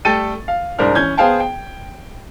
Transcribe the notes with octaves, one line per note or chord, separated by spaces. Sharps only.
G3 A3 A4 G5 A6 D#7
F5
C2 G#2 D4 A#4 C5 F6
E3 C#4 G6 G#6
B3 G#4 C5 F5 G5 A5
G5